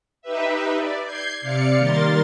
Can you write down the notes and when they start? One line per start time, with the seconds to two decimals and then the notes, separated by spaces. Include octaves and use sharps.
0.22 D#4 G4 B4 E5
0.76 D5
1.04 G6 G#6 C7
1.41 C3 D5 F5 C#7
1.77 D#3 G3 A#3 A#4 C6 A6